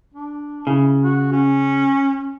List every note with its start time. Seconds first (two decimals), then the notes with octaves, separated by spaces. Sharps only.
0.14 D4
0.67 C#3 E4
1.03 F#4
1.32 C#4